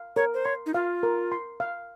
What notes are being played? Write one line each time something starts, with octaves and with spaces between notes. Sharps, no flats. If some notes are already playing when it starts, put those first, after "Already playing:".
Already playing: F5
A#4 C#5
C5
C#5 C6
D#4
F4 F5
A#4
C6
F5